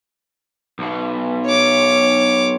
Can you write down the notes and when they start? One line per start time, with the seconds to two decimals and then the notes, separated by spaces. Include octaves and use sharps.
0.79 B1 B2
1.45 C#5 D6